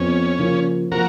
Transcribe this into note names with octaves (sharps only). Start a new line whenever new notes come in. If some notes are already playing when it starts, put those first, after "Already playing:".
Already playing: F2 F3 B3 C#4
C#3 F3 A#3 F4
F3 A#3 F#4 A#4